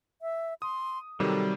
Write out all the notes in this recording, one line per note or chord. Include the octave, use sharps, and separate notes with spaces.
E5
C6 D#6
C3 D#3 F#3 G3 A4